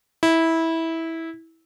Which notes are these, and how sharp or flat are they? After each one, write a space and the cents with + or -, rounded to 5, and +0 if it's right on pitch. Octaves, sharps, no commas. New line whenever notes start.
E4 -15